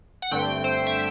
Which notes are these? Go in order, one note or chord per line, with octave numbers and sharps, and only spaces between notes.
F#5
G2 D3 A3 C4 G5
C5
E5